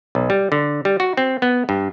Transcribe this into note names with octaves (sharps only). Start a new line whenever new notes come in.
B1
G3
D3
G3
F#4
C4
B3
G2